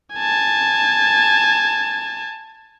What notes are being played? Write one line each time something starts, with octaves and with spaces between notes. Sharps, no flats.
G#5 A5